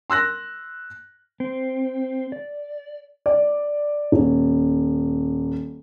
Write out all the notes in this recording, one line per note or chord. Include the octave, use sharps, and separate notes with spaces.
C6 E6 F#6 A#6
C4
D5
D5
D#1